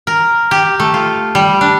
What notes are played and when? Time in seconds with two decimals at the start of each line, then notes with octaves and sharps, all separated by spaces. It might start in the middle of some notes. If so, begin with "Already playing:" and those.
0.07 A#4
0.51 G4
0.80 A3
0.94 F4
1.35 G3
1.61 D4